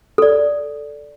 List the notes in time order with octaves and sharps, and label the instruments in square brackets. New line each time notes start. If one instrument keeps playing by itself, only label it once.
[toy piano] A4 D5